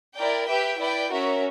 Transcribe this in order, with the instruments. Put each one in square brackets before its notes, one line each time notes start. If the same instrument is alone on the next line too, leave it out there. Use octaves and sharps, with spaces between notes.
[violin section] E4 A#4 D5 G5
G4 B4 E5 G5
E4 B4 D5 G5
C#4 F#4 A#4 E5